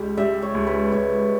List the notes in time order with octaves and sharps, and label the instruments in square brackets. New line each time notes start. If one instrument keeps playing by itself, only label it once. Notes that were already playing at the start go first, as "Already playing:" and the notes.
Already playing: [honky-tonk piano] C#2 G3
[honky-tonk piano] G3 [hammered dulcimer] E5
[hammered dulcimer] C#5
[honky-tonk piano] C#2
[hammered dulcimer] B4
[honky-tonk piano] C#2 [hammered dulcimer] C#5